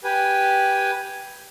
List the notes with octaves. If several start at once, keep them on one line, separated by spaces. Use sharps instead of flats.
G4 B4 G#5